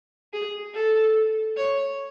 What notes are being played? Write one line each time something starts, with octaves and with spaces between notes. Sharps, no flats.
G#4
A4
C#5